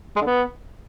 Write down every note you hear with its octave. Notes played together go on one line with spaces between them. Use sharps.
G#3
D3
B3